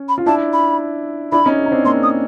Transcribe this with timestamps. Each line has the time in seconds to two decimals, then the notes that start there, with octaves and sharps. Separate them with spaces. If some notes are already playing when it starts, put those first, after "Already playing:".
Already playing: C#4
0.09 B5
0.18 F4
0.26 D4 E4 A5
0.53 B5
1.32 D4 E4 B5
1.46 C#4 D#4
1.66 D#4
1.72 C4 D4
1.85 A#3 C4 C6
2.03 D#6